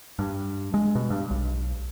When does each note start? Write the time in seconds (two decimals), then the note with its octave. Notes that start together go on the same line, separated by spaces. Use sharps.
0.19 G2
0.74 G#3
0.95 B2
1.10 G2
1.31 B1